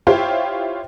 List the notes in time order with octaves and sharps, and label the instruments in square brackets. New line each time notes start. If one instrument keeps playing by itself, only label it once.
[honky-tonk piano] E4 F4 G4 C5 C#5 G5